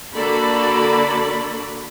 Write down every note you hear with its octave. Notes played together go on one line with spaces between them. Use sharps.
D3 A#3 F#4 A4 D5 B5